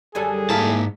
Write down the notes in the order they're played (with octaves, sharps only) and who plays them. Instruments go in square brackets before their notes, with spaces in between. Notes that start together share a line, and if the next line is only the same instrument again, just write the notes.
[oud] F#2 D3 G3 [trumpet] G#4 [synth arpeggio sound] A4 G#5
[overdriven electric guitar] G#2 A5 [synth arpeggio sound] A#3 E4 B6